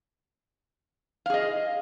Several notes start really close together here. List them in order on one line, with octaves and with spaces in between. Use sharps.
F5 G#4 D#5